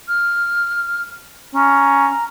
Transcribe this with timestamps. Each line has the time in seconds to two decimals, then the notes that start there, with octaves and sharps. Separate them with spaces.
0.08 F6
1.55 C#4 A#5